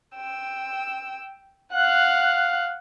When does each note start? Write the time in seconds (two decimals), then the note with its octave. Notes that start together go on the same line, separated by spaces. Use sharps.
0.16 G5 E6
1.73 F5 F#5 F#6